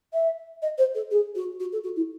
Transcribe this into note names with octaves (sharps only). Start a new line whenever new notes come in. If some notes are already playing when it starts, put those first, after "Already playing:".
E5
D#5
C5
A4
G#4
F#4
F#4
A4
F#4
E4